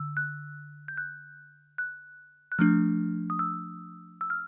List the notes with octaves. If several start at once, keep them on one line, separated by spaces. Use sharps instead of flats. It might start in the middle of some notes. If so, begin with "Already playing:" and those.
Already playing: D3 E6
F#6
G6
F#6
F#6
F#6
F3 A3 D4 F6
D#6
E6
E6
F6